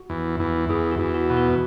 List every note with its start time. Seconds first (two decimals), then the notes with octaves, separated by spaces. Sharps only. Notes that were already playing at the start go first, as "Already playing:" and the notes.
Already playing: F#4
0.10 E2
0.40 E2
0.69 E2 G#4
0.91 F#4
0.99 E2
1.14 F#4
1.30 B2
1.37 F#4